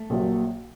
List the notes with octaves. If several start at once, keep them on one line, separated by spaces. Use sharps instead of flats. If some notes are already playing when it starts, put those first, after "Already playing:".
Already playing: A3
A#1 A#2 F#3